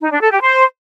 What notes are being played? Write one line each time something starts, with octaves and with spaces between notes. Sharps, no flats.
D#4
D4
A4
G4
C5